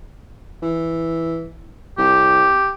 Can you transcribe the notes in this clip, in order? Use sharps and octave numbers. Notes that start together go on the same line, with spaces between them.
E3
C2 G4